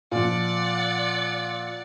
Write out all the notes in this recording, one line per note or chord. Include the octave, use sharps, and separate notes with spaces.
A#2 F3 D5 F#5